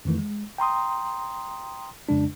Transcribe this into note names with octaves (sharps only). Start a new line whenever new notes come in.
F2 D#3 E3 A3
G#3
G5 A#5 C6 D#6
F2 C#3 G#3 D4